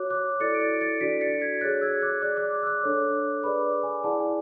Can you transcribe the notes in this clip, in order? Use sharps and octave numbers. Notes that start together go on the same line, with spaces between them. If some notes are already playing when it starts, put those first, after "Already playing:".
Already playing: F#4 C#5 D6 F#6
D6 F#6
E4 A4 D5 A6 C#7
D7
A6 C#7
D7
A6 C#7
D4 F#4 A4 D5 B6 D7
A6 C#7
G#6 B6
G#4 C#5 F#6 A6
E6 G#6
D6 F#6
G#4 D5 D6 F#6
D6 F#6
E6
D6 F#6
D4 A4 C#5
G#4 B4 D5 B5 D6
G#5
E4 G#4 D5 F#5 A5
G#5